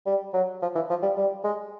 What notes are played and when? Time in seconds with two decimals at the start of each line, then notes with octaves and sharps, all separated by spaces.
0.06 G3
0.34 F#3
0.62 F3
0.75 E3
0.90 F3
1.03 G3
1.17 G3
1.44 G#3